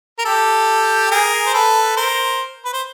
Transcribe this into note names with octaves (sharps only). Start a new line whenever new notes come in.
A#4
G4 A4
G#4 A#4
C5
A4 B4
A#4 C5
B4
C5